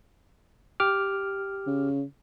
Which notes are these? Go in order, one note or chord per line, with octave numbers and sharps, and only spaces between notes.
G4 D6 F6
C#3